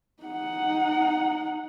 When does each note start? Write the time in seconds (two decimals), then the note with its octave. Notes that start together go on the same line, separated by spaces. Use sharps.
0.22 D#4 F#5